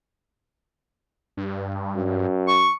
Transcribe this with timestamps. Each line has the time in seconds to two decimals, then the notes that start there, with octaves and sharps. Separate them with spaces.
1.37 G2
1.96 F#2
2.47 C#6